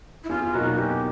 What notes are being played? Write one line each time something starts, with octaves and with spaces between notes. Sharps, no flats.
E4
E2 F4
B2 F#3 A#3 D#4 F#4
E2 G4